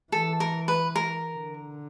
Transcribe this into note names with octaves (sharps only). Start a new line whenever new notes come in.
E3 A4
A#4
B4
A#4
D3